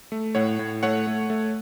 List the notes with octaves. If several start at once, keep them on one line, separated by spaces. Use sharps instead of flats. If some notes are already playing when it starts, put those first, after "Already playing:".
A3
A2 C#5 F#5
A2
A3 C#5 F#5
A3
A3